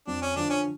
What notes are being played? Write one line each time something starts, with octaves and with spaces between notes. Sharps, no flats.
F2 D4
C#4
D3 F3 D4
C#4